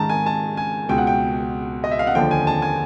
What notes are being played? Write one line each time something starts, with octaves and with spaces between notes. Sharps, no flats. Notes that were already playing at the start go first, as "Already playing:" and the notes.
Already playing: G#2 D#3 A5 A#5
G#5
A5
G#5
C#2 B2 G5
F#5
G5
D#5
E5
F5
F#5
D#2 D3 F3 G5
G#5
A5
G#5